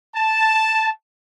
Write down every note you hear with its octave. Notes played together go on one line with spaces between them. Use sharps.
A5